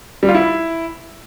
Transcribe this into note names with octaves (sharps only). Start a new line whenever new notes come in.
G3
F4
E4